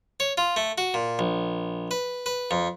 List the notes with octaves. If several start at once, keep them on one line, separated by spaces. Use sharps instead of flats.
C#5
F4
A3
F#4
A#2
A#1
B4
B4
F2